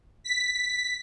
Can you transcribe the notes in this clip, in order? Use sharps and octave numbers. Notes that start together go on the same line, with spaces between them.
B6